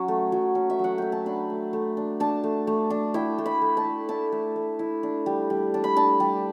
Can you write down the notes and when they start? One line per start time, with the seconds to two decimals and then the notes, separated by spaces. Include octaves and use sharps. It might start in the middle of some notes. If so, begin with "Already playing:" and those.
Already playing: F#3 C#4
0.08 A3
0.32 F#3
0.55 C#4
0.70 E5
0.79 F#3 F#5
0.98 A3 G5
1.12 A5
1.26 D4 B5
1.50 A3
1.73 A3
1.97 D4
2.20 D4 A5
2.44 A3
2.67 A3
2.90 D4
3.14 E4 G5
3.38 A3
3.46 B5
3.62 A3
3.77 A5
3.85 E4
4.09 E4 A5
4.32 A3
4.56 A3
4.79 E4
5.03 D4
5.26 G3
5.50 G3
5.74 D4
5.84 B5
5.97 D4 A5
6.20 G3